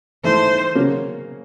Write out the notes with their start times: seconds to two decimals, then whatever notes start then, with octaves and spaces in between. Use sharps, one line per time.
0.24 G#2 E3 A3 C5
0.75 C#3 F#3 A#3 C#4